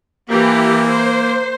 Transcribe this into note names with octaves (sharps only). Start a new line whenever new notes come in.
E3 A#3 G4
C5